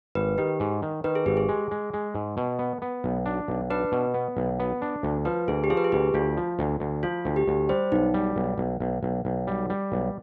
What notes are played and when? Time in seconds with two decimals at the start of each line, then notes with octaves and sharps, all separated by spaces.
0.15 G#1 B4
0.38 D#3 G4
0.60 G#2
0.82 D#3
1.04 D#3 B4
1.15 G#4
1.26 G#1 G4
1.37 G#4
1.49 G#3
1.71 G#3
1.94 G#3
2.15 G#2
2.37 B2
2.59 B3
2.82 B3
3.04 B1
3.26 D4
3.48 B1
3.70 D4 B4
3.92 B2
4.14 B3
4.37 B1
4.60 B3
4.82 D4
5.03 D2
5.25 F3 B4
5.48 D2 G#4
5.64 G4
5.70 F3 G#4
5.77 B4
5.84 G#4
5.92 D2 G4
6.14 D2 F4
6.37 F3
6.59 D2
6.80 D2
7.03 F3 F4
7.25 D2
7.36 G4
7.48 D2
7.69 G3 C5
7.92 B1 D#4
8.14 G3
8.36 B1
8.58 B1
8.80 B1
9.03 B1
9.25 B1
9.47 G3
9.70 G3
9.92 B1